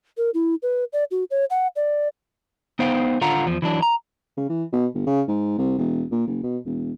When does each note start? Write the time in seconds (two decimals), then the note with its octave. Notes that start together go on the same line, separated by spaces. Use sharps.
0.17 A#4
0.34 E4
0.62 B4
0.93 D5
1.11 F#4
1.31 C#5
1.50 F#5
1.76 D5
2.79 B3 D#4 C5 F5 G5
3.21 D3 F4 F5 F#5 A#5
3.46 E2 F3
3.62 E3 F#3 D4
3.82 A#5
4.37 C#3
4.49 E3
4.73 B2
4.94 G1
5.07 C#3
5.28 G#2
5.58 C2
5.78 E1
6.11 A#2
6.27 F#1
6.43 B2
6.65 E1